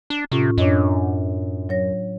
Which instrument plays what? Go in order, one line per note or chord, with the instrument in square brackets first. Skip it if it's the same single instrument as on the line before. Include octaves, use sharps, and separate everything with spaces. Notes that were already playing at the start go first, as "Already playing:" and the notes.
[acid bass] D4
[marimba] A2 C#4 F4 [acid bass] C3
[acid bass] F#2 [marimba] D4 C#5 D#5
[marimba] F#3 C#5 A#6